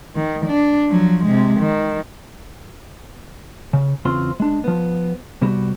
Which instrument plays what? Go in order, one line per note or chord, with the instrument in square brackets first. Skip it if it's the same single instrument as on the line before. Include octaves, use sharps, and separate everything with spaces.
[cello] D#3
D4
F3 F#3
C3 G#3
D#3
[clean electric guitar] C#3
E2 C#3 C4 F4 C6
G#3 D4
F3 B3
C3 G3 B3 F#4 G4